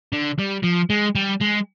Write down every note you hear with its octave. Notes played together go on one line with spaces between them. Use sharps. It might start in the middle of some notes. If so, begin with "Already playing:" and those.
D3
G3
F3
G#3
G3
G#3